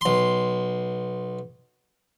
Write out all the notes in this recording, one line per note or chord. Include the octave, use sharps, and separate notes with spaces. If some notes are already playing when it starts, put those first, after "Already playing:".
B1 C6